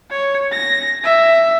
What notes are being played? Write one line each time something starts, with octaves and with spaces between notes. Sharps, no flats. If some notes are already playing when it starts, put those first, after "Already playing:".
C#5
A#6
E5